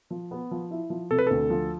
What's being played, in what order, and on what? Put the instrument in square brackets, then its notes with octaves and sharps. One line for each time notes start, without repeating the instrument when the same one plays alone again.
[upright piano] F3
B3
F3
E4
F3
[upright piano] C3 [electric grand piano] A4
[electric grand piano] B4
[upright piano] D2 [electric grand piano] A4
[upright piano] F3